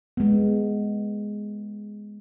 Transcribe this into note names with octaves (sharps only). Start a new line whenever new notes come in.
G#3 B3